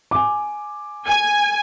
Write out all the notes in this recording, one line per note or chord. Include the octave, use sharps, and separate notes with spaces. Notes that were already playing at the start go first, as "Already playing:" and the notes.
G#5 D6
G#5